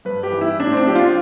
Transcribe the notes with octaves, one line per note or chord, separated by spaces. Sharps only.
G2 B4
G4
E3
E4
A2 D4
C4
D4
F3 G4
F4